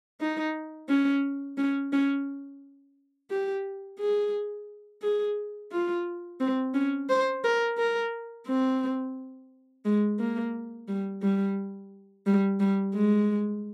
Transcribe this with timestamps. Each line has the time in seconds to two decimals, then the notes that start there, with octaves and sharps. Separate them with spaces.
0.20 D#4
0.89 C#4
1.58 C#4
1.92 C#4
3.30 G4
4.00 G#4
5.02 G#4
5.72 F4
6.40 C4
6.74 C#4
7.09 C5
7.44 A#4
7.78 A#4
8.46 C4
9.85 G#3
10.19 A#3
10.88 G3
11.22 G3
12.26 G3
12.60 G3
12.94 G#3